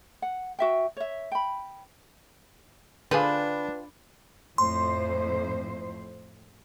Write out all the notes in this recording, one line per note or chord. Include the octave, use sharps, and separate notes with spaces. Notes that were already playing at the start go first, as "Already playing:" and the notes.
F#5
F#4 E5 G5
C#5 E5
G5 B5
D3 D4 F4 G#4 B4 C5 G5
F2 A2 C5 C6